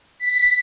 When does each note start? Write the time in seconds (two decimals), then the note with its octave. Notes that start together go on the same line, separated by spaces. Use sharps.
0.20 B6